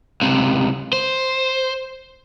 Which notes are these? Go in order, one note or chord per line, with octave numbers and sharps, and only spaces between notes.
C#2 C3
C5